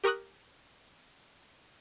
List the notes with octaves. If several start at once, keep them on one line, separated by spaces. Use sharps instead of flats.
G4 A#4 C#6 D#6 F#6